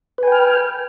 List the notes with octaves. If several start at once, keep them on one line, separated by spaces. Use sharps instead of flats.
B4 G5 G#5 F6